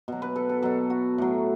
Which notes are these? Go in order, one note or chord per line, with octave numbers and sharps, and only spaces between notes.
B2 F#3
B4
A4
A4
B2 F#3 A4
F#4
A2 F#3